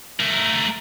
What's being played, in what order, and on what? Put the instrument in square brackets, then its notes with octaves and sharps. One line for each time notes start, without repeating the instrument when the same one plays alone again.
[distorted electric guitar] A3 A#4